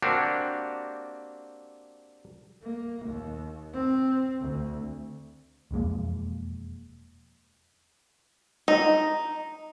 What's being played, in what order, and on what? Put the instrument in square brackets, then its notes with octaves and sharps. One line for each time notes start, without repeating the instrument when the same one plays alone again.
[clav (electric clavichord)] A#3 C4 D4 F#4 G4
[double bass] A#3
D#2
C4
D2
[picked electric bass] E1 F2 G#3 A#3
[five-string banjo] D#4